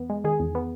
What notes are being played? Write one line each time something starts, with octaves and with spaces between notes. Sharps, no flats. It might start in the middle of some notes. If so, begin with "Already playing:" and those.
Already playing: E2 B3
G#3
D#3 G#4
E2
B3